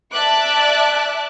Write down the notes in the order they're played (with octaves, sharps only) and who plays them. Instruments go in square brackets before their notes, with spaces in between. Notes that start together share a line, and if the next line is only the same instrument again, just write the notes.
[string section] D5 E5 A5 D6 F#6